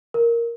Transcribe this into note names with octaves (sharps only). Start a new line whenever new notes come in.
A#4